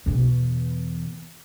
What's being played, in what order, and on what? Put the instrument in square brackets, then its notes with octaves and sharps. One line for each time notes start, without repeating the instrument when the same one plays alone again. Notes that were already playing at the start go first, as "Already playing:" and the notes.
[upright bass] E2 B2